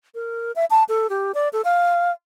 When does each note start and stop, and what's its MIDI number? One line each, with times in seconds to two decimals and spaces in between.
0.15 0.52 70
0.56 0.65 76
0.70 0.84 81
0.89 1.07 69
1.10 1.32 67
1.35 1.48 74
1.53 1.61 69
1.65 2.11 77